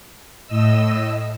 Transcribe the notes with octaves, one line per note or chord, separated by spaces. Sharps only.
A2 D#5 E6